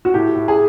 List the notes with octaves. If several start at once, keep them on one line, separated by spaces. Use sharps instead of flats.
F#4
A2 G4
A2
G#4